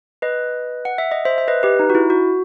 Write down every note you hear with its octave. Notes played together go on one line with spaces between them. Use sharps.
B4 D#5
F#5
E5
D#5
C5 E5
E5
B4 D#5
G4 B4
D#4
F#4
E4
F#4